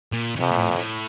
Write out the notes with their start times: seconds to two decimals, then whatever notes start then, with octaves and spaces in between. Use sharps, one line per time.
0.12 A#2
0.36 C#3
0.39 F2 C3
0.51 A#2
0.58 A2
0.71 A#2
0.76 A2